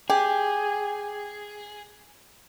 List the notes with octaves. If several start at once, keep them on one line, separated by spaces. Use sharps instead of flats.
G4 G#4